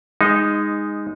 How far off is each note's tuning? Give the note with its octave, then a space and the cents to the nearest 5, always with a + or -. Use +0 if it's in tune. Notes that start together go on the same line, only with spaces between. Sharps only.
G#3 -15 D#4 +0